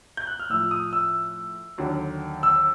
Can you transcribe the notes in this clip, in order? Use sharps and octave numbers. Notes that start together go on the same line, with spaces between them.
G6
F#6
F6
A2 F3 E6
D#6
E6
D#2 D3 F#3
E6